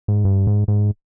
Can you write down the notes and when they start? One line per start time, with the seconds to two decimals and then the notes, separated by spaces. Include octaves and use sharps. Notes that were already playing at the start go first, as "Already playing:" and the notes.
0.08 G#2
0.25 G2
0.47 G#2
0.68 G#2